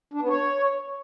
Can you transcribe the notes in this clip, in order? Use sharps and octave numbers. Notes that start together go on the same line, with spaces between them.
D4
B3
C#5